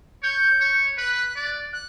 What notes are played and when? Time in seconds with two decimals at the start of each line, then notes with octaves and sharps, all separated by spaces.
0.23 C#5 G6
0.61 C#5
0.97 B4 F#6
1.36 D5
1.73 F#6